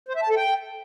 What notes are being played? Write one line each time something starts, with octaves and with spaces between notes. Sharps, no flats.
C5
E5
A5
A4
G5